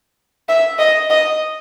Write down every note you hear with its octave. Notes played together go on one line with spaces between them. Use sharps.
E5
D#5
D#5